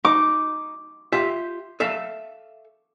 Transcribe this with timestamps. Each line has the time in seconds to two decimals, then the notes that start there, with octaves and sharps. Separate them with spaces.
0.05 D#4 D6
1.12 F4 G4 E5
1.80 A4 E5 F5